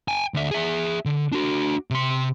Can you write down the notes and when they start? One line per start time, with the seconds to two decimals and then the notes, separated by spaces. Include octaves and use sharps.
0.08 G5 G#5
0.34 D2 E5
0.51 G#4 E5
1.05 D3
1.32 D4 F#4
1.91 C3 C6